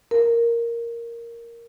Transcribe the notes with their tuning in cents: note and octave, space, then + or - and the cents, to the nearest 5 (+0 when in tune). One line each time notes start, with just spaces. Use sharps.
A#4 +0